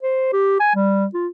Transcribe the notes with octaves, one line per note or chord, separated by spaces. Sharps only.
C5
G4
G#5
G3
F4